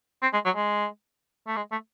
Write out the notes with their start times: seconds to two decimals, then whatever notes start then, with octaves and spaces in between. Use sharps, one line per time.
0.22 C4
0.33 G#3
0.45 F#3
0.56 G#3
1.47 A3
1.56 G#3
1.71 A3